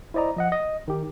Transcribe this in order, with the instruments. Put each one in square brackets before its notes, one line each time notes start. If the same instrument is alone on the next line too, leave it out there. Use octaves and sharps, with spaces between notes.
[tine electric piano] E4 C5 D5 D#5 A#5
F3 D#5 F#5
D#5
D#3 G4